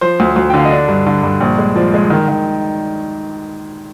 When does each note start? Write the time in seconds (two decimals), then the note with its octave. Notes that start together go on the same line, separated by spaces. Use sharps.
0.01 F3 C5
0.20 D2
0.36 D2
0.50 G5
0.54 D3 F5
0.65 D#5
0.71 D4 D5
0.88 G2
1.06 D3
1.23 G2
1.40 A#1
1.59 G#3
1.75 F3 D5
1.94 G#3
2.10 D#3
2.28 D#3